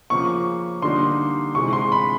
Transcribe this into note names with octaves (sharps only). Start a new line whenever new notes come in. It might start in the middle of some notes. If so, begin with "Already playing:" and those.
C#3 F3 A#3 C#6
D3 G3 A#3 D#4 C6
C3 E3 G#3 C#6
C6
B5